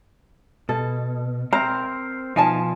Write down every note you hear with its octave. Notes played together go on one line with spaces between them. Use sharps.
B2 A4
C4 A#4 C5 A#5
B2 F3 D#4 G#5 A5